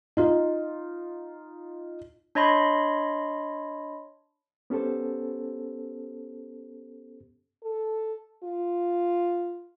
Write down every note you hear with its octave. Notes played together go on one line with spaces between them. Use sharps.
D#4 F4
D4 C#5 D#5 B5 C6
B3 C#4 G4 A4 C5
A4
F4